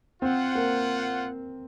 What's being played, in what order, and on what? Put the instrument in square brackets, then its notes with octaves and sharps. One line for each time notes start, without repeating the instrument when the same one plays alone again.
[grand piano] C4 [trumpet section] F4 C5 F#5
[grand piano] A#3